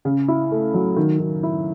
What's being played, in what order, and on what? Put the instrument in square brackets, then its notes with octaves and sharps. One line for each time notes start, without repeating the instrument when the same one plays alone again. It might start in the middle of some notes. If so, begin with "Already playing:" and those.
[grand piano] C#3
E4
A3
F#3
D#3
D#3
E4